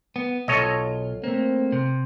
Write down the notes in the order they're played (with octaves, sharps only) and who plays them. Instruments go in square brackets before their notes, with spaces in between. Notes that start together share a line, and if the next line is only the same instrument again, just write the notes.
[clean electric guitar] B3
[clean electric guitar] B1 F4 [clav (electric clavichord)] A4 C#5 D#5
[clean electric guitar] A3 A#3 [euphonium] C4
[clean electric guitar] C3